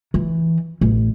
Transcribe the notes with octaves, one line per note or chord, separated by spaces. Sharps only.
E3
A1